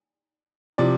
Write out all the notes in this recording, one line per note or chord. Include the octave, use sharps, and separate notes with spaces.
C3 F3 D5